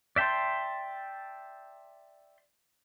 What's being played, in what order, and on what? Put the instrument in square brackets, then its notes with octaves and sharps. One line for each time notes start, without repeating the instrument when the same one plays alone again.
[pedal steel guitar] D5 E5 G5 A5 C6